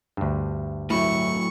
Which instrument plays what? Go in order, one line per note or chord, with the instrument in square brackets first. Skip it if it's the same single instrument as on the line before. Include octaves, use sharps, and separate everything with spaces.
[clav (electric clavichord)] D2 G2
[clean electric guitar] A2 F#3 [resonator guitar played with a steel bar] E4 [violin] C#6